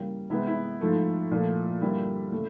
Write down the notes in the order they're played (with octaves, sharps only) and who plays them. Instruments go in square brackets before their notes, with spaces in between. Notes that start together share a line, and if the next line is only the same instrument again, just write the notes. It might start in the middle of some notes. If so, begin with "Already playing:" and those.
Already playing: [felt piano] C#3 E3 G3 A#3
C3 E3 G#3 B3 E4
E4
G#2 F3 A3
A#2 F3 A3
G2 D3 G3 A#3 E4
C#3 E3 A3